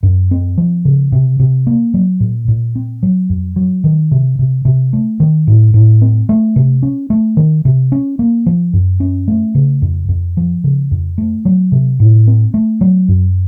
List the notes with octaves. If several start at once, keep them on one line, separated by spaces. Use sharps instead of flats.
F#2
C4
F3
C#3
C3
C3
A#3
F#3
A#2
A#2
C4
F#3
F2
F#3
D#3
C3
C3
C3
A3
D#3
A2
A2
C4
A3
C3
C#4
A3
D#3
C3
C#4
A#3
F3
F#2
C#4
A3
C#3
F2
F2
F3
C#3
F2
A3
F#3
C3
A2
C4
A3
F#3
F#2